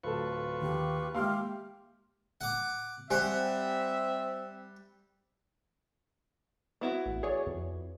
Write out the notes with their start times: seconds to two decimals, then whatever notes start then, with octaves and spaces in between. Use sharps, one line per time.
0.04 D1 F4 A4 B4 C#6
0.62 D#2 G4
1.15 D#3 G#3 A#3 G4 F5 C6 F6
2.41 F#5 D6
3.10 G3 C4 G4 C5 E5 F#5 G#5
6.81 B3 E4 F#4
7.06 A1
7.23 G#4 C#5 D5
7.47 F2